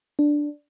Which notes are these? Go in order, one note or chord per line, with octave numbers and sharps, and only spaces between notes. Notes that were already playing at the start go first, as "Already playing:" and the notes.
D4